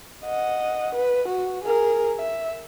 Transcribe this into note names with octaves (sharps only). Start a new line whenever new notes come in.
D#5 F#5
B4
F#4
G#4 A#4
E5